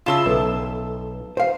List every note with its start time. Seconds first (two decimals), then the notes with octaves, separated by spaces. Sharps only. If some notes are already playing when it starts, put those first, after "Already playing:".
0.06 C#3 E4 F4 A5 C6 E6
0.26 B1 A4 B4 E5
1.37 C5 F5